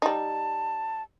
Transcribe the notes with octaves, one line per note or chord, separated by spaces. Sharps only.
G3 D#4 A5